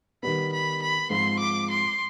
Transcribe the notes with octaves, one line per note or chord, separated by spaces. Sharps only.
D#3 G3 B3 B5
B5
B5
G#2 F3 C4 F4 C5 C6
D6
C6